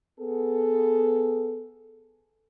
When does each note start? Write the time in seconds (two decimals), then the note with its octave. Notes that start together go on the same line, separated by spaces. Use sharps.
0.19 B3 G#4 A4